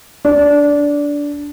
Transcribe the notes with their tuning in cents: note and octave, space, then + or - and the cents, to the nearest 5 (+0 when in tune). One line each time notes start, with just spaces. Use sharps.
D4 -15